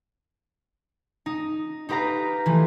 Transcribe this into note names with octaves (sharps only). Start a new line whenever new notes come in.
D#4
D#4 G4 B4 F5 A#5
E3 F3 A3